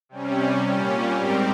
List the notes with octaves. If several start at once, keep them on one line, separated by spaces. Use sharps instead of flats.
C3 G3 C#4
A#2 G3 C#4
G#2 G3 C4 G4 A#4